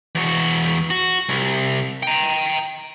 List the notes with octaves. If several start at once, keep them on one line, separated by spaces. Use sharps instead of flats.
E2 F#4
F#4
C2
G5 A#5